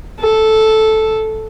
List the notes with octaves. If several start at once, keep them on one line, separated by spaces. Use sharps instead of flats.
A4